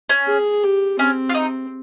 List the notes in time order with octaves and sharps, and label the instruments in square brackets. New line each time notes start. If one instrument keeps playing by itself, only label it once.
[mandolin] C#4
[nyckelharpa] G#4
G4
[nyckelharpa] C4 [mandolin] C#4
[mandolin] F4
D#4